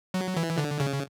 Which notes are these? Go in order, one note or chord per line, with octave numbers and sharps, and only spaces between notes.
F#3
E3
D3
C#3